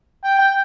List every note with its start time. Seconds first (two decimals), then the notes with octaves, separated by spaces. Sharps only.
0.24 G5
0.39 G5